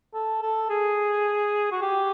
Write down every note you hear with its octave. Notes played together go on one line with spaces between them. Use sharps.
A4
A4
G#4
F#4
G4